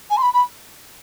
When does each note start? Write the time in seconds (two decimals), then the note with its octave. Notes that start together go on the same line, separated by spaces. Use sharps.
0.10 G#5
0.17 C6
0.22 B5
0.33 B5